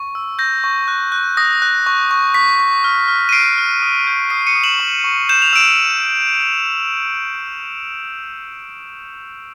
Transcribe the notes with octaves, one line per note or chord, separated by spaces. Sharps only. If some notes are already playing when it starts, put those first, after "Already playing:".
Already playing: C#6
E6
G6 A#6
C#6
F#6
F#6
D#6 A#6
F#6
C#6
C#6
C#6 B6
C#6
F6
F6
D#7
F6 C7 D7
F6
D#6
G6
D#6 C7 D7
C#7 D#7
D#6
E7 F#7
C#6
C#6
G6 E7
F7
E6 D7 E7